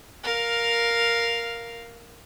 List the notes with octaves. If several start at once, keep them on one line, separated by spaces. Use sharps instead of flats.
A#4 F5